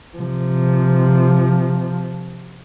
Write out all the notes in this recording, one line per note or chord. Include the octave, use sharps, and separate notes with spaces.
C3 F3